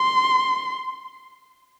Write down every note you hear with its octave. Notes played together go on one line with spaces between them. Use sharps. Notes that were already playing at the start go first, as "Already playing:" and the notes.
Already playing: C6